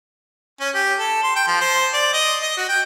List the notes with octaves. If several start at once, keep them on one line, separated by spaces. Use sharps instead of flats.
C#4
G4
A4
C6
G5
F3
C5
D5
D#5
D#5
F#4
G5